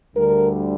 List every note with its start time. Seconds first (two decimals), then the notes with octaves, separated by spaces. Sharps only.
0.15 D2 D3 G3 A#4